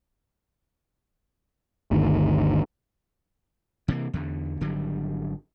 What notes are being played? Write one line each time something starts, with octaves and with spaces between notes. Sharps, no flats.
G1 D2 D#3
C3 E3 F#3 A#3
E2 D3
G#1 D3 F#3 G3